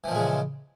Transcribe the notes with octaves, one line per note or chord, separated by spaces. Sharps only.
A#2 C#3 E3 F3 G#3